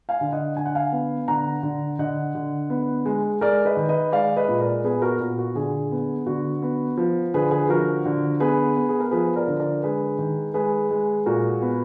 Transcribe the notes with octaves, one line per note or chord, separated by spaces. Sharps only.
F5 G#5
D3
D#5 F#5
D3 G#5
F#5
F5 G#5
B3
D3 F#5 A#5
D3
D3 D#5 F#5
D3
B3
G#3
G#3 A#4 D5
B4 D#5
D#3
B4 D#5
G#3 D5 F5
B4 D#5
A#2
A#4 D5
B3 G#4 B4
F#4 A#4
A#2
F#4
D3 G#4
B3
D3 F#4
B3
F3
D3 G#4 B4
G#4 B4
F3 F#4 A#4
D3
B3 G#4 B4
B3
G#4
A#4
F3 G#4 B4
A#4 D5
D3
A#4 D5
G#3 G#4 B4
D#3
G#3 G#4 B4
G#3
A#2 F#4 A#4
B3